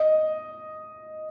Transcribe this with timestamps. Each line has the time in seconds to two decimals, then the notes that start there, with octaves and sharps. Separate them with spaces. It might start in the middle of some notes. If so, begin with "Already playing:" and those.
Already playing: D#5